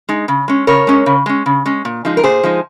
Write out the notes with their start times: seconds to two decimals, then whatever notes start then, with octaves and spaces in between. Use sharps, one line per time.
0.09 G#3 D#4
0.28 C#3
0.48 G#3 C#4
0.67 C#3 A#4 C#5
0.87 G#3 C#4
1.06 C#3
1.26 G#3 C#4
1.46 C#3
1.65 G#3 C#4
1.85 A#2
2.05 F3 G#3 D#4
2.17 A#4
2.23 A#2 G#4 C5
2.43 F3 G#3 D#4